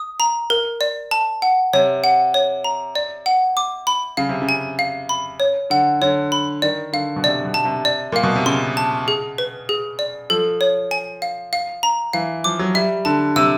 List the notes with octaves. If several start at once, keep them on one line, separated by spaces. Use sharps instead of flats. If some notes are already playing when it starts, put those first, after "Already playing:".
Already playing: D#6
A#5
A#4
D5
A5
F#5
C3 C#5
F#5
C#5
A#5
D5
F#5
D6
B5
C#3 F5
C3
C#3
G#5
F5
B5
C#5
D3 F#5
D3 C#5
B5
D#3 D5
D3 F5
B2
C3 D5
B2
A5
C3
D5
A#2 F5
B2
C3
C#3 C6
A5
G#4
B4
G#4
D5
F3 A4
C#5
G#5
F5
F5
A#5
E3 F5
F3 D6
F#3
G3 E5
D3 A5
C3 E6